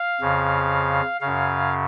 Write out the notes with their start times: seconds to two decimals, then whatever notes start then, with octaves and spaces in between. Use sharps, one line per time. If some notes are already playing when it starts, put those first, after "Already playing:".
Already playing: F5
0.21 F2 C#3
1.21 F#2 C#3 F5